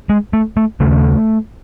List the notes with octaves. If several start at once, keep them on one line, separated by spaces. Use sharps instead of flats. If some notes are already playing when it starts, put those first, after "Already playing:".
G#3
A3
A3
D#2 C#3 A3